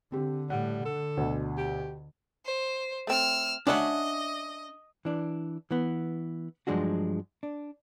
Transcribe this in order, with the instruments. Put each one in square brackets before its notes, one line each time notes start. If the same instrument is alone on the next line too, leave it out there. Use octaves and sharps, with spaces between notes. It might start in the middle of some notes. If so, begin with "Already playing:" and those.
[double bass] D3 [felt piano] C4 G4
[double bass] A2 [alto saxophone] G3 [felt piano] F#5
[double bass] D3 [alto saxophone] A4
[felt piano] D2 B2
[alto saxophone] G4
[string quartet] C5
[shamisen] A3 C4 [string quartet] E6 F6
[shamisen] C#4 [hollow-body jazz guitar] D4 E5 F#5 [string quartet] D#5
[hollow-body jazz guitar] E3 D4
E3 B3
G2 F3 F#3 G#3 D4 F#4
D4